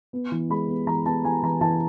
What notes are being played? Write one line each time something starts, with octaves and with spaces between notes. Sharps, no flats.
B3
E3
G#3 B5
B3
E3 A#5
B3 A5
E3 G#5
E3 A#5
E3 A5